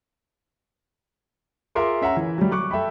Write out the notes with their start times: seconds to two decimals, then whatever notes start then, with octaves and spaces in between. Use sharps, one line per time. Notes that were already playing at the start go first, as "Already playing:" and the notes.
1.75 F4 G#4 A#4 E5 C6 D6
2.02 C#4 E5 F#5 A#5
2.17 E3
2.38 F#3 G3
2.52 C#6 D6 F#6
2.71 A4 E5 G5 B5